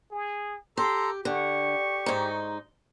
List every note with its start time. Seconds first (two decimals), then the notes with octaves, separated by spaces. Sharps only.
0.11 G#4
0.77 G4 A4 A#5 C6
1.25 D3 G4 C#6
2.06 G#2 D#4